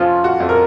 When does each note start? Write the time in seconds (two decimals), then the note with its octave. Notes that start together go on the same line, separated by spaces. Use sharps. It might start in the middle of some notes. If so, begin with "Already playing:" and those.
Already playing: F2 F3 C#4 F4
0.24 F#4
0.40 F2
0.49 A#4